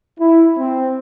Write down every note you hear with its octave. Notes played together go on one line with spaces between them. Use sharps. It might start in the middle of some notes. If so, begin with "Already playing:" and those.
E4
C4